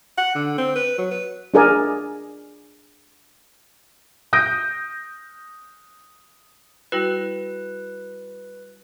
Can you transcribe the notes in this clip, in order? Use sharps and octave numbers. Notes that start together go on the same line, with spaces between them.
F#5
D3
C4
B4
F#3
B4
D4 F4 G#4 A#4 D5 G#5
D#6 G6 A#6 D7
G3 E4 F#4 B4